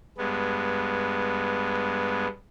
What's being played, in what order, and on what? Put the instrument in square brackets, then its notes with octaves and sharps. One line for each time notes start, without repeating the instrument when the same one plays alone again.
[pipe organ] G2 G#3 B3